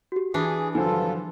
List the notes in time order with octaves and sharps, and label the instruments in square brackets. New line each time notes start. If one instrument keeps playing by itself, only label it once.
[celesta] F#4 G4
[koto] E3 D4 [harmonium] G#4
[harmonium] G2 F4 A4 [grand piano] D3 F3 F#3 [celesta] G#5